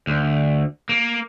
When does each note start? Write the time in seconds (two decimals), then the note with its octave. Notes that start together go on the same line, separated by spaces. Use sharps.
0.07 D2
0.89 A#3